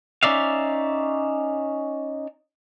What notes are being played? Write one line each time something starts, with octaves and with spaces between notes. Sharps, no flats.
C#4 D#4 D5 E5 F5